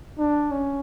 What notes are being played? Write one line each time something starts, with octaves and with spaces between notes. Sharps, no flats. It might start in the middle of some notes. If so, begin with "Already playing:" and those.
D4
C#4